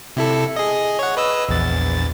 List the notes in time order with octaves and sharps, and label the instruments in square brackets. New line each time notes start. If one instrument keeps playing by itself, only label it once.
[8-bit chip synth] C3 E4 A4
G#4 D#5
C#5 F#5
B4 D#5 E6
A#1 E2 A6